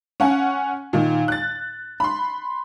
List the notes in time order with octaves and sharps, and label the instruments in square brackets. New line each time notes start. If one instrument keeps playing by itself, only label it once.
[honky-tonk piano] C#4 F#5 G#5
A#2 D#3
F#6 A6
B5 C6